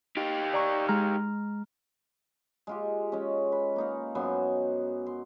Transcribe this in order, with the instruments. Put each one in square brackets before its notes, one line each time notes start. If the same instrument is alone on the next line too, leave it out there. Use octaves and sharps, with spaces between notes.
[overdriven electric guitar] D#4 G4
[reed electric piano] D5 A#5 C#6
G#3 A#5 F6
[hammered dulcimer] G#3 F4 G4
G#3 C#4
B4
A#3 D#4 F5
F#2 B3 C5 G#5
C6